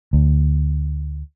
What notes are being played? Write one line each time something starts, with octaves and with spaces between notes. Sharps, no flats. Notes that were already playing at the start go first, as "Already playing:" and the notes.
D2